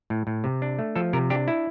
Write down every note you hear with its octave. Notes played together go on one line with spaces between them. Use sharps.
A2
A2
C3
D4
A3
F3 A4
C3 A#4
D4 G4
E4